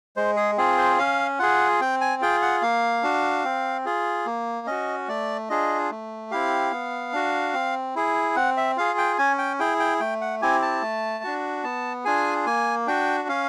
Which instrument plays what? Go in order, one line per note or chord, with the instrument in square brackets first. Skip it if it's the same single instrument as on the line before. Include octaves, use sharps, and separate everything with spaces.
[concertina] G#3 C5
G#4
C4 F4 G#4
C5
C#4 F5
F4 G#4 F#5
C4 G5
G#5
F4 G#4 G5
F#5
A#3 F5
D4 F#4
C4
F4 G#4
A#3
C#4 F#4 D#5
A3 D5
D4 F4 G#4 D#5
A3
C4 E4 G4 F5
B3
D4 F#4
C4
E4 G#4
C4 F#5
E5
F4 G#4 F5
G5
C#4 G#5
G5
E4 G#4 G5
G5
A3 G5
F#5
C4 E4 G4 G#5
A5
A3
D4 F#4
B3 A5
D4 F4 G#4 G#5
A#3 G#5
D4 F#4 G5
C#4 F5